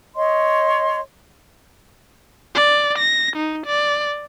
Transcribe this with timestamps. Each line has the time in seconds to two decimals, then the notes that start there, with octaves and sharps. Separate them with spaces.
0.15 C#5 D#5 C6
2.55 D5
2.98 A#6
3.36 D#4
3.66 D5